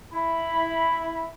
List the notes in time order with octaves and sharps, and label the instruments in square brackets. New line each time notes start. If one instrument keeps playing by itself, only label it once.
[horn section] E4 B5